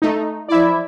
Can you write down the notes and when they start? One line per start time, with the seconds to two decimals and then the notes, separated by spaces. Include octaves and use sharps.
0.02 A3 D#4
0.48 F3 E4 D5 E5